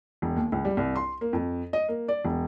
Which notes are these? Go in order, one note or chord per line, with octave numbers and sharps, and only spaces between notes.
E1
D#2
C#2
G3
C2
C6
A#3
F2
D#5
A#3
D5
E1